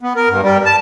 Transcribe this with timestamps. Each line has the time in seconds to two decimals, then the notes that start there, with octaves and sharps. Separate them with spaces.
0.01 B3
0.16 A#4
0.29 G2
0.42 G3
0.66 A5